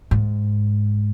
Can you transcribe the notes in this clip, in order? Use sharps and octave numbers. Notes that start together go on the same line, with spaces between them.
G#2